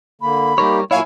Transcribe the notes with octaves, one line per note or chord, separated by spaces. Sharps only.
D3 A#3 B5
G3 A#3 D#4 G4 A#4 C#5
A#2 F#3 A#3 E4 C#5 F5 G#5